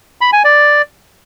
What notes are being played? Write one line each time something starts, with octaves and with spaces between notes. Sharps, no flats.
B5
G#5
D5